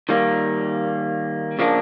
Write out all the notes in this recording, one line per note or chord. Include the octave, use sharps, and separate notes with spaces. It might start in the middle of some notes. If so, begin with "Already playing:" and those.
D#3 G3 A#3
C#3 F3 A#3 D4